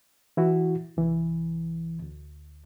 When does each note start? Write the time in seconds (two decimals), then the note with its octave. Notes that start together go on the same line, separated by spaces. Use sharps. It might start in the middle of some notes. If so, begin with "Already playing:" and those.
0.37 E3 E4 F#4
0.97 C2 E3
2.02 D2